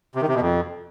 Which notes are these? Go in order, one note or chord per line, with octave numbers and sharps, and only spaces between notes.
C3
D#3
C3
B2
F2